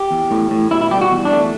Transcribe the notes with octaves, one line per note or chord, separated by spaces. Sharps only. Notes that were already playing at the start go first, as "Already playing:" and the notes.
Already playing: G4
E2
A2
A2
B2 E4
E4
G3 G4
F#4
E2
D4
A3